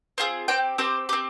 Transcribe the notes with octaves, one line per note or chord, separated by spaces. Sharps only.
C4 F4 G#4
C4 G4 G5
C4 G4 C5
C4 G4